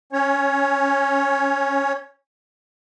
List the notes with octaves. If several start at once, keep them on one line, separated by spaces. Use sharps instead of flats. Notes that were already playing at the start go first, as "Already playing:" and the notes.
C#4 C#5